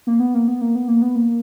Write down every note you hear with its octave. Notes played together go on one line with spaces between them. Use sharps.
A#3
B3
A#3
B3
A#3
B3
A#3
B3
A#3